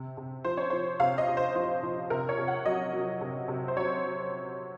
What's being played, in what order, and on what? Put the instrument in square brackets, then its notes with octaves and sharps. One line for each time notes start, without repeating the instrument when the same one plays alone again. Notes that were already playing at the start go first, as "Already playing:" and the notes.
Already playing: [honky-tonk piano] C3
C3
F3 C5
C#5
F3 C5
C3 F5
D#5
C3
C5
F3 C5
F3
C3 A#4
C#5
C3
F#5
F#3 D#5
F#3
C3
C3
C5
F#3 C#5
F#3